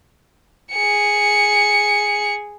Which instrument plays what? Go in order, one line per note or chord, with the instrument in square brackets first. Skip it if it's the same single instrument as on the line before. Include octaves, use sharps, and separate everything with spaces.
[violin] G#4 C#7